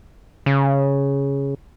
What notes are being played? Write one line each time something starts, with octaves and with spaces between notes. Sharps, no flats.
C#3